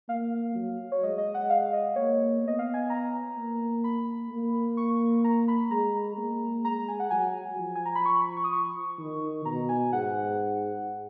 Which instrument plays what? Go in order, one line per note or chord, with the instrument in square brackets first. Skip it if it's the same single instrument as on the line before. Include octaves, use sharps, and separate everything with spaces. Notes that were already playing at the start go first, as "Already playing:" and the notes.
[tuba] A#3 [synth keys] F5
[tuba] F#3
[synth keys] C#5
[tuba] G#3 [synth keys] D#5
[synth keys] D#5
F#5
F5
D#5
[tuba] A#3 [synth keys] C#5
[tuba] B3 [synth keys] D#5
[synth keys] F5
G#5
A#5
[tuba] A#3
[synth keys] B5
[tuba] A#3
[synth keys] C#6
A#5
B5
[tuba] G#3 [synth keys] A#5
[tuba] A#3
[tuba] G#3 [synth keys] A#5
[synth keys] G#5
F#5
[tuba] F#3 [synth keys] G#5
[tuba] F3
[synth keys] G#5
A#5
B5
C#6
B5
C#6
D#6
C#6
[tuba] D#3
[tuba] B2 [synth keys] A#5
[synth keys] G#5
[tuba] G#2 [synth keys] F#5